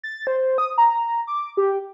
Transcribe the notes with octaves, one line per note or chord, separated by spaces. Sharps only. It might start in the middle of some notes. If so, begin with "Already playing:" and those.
A6
C5
D#6
A#5
D6
G4